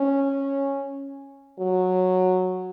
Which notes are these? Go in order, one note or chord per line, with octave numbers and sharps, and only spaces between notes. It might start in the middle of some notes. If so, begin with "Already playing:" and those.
Already playing: C#4
F#3